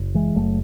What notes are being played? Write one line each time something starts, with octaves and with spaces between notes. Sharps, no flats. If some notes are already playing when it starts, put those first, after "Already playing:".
Already playing: F#1
E3 G#3
F#1 F#3 A3